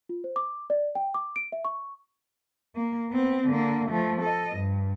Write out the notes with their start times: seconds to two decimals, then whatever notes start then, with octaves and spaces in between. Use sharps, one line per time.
0.09 F4
0.24 C5
0.36 D6
0.70 D5
0.95 G5
1.14 D6
1.36 D7
1.52 E5
1.65 C#6
2.76 A#3
3.10 B3 C4
3.47 D3 A#3
3.91 F3 A3
4.21 A4 D#5
4.56 G2